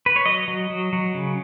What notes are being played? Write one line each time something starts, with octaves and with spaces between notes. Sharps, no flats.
B4
C#5
F#3 D#5
F#3
F#3
F#3
C#3